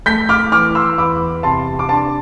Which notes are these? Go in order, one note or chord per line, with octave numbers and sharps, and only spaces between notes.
A3 G6 B6
D6 F6
E3 D6 F6
C6 E6
E2 B5 D6
C3 A5 C6
D6
D4 A5 C6